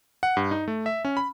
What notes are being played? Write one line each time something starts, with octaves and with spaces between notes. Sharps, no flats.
F#5
G2
D#4
A3
E5
C#4
B5